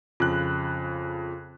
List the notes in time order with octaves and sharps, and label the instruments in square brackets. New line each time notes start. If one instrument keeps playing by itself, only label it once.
[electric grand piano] F2 C#3 F#6 [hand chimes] F4